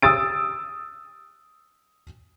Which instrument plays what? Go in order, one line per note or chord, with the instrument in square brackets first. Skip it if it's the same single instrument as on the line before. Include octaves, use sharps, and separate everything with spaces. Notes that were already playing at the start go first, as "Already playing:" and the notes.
[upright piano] D#6 E6 A6 D7